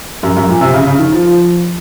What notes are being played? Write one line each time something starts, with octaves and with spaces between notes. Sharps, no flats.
F#2
F#2
A#2
C3
C#3
C#3
D#3
F3
F3